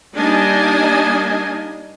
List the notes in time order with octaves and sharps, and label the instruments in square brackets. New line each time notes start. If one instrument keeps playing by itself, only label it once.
[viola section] G3 A#3 D4 D#4 D#5 G#5